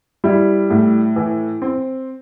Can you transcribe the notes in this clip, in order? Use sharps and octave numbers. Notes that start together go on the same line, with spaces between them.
G3 E4
A2
E3
C4